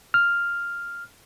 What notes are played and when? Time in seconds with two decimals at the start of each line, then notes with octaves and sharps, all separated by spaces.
0.14 F6